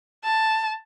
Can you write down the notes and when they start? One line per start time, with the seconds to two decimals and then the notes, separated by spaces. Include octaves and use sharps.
0.24 A5